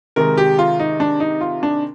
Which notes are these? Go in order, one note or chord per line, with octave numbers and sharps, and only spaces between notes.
C3 D#3 G#3 A#4
G4
F4
D#4
D4
D#4
F4
D4